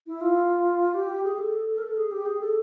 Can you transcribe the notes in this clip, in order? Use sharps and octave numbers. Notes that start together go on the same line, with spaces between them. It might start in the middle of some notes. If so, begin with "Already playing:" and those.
E4
F4
G4
G#4
A4
A#4
A4
G#4
G4
G#4
A4